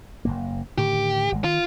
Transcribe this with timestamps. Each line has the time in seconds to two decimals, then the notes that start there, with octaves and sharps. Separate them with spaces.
0.25 F#1 E2 A#3
0.78 A2 D3 D#3 G4
1.32 G#1 G#3
1.44 D#3 F4